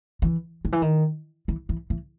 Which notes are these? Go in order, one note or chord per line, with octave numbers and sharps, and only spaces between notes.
E3
D#3
E3
D#3
E3
E3
E3